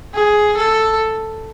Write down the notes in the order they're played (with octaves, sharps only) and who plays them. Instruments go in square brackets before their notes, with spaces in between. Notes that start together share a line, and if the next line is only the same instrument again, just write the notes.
[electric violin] G#4
A4